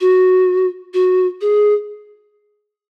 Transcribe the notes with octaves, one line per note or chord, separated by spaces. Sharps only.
F#4
F#4
G#4